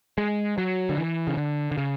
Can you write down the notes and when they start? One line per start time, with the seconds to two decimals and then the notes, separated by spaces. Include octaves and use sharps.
0.18 G#3
0.58 F#3
0.89 D3
0.98 E3
1.27 C#3
1.37 D3
1.71 D3
1.78 C#3